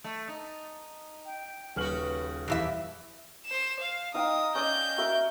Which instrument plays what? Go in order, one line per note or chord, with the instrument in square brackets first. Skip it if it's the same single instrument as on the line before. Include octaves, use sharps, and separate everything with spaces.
[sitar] A3
D#4
[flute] G5
[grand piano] D#1 F6 F#7 [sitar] C#3 F#4 [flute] B4
[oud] F2 E3 E5 [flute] G4
[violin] C5 E7
F5
[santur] D#4 F5 G5 [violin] D#6
[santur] C#4 D5 D#5 [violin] G6
[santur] F#4 A#4 E5